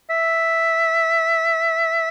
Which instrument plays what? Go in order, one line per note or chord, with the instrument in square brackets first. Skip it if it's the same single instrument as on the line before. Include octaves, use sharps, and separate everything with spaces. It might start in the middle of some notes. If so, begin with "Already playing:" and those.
[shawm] E5